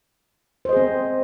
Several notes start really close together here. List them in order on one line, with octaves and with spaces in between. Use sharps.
C5 D#5 G#4 C4